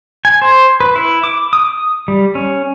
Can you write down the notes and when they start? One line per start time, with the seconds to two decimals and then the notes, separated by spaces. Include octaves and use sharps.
0.25 G#5
0.42 C5
0.80 B4
0.96 E4
1.23 D6
1.53 D#6
2.08 G3
2.35 C#4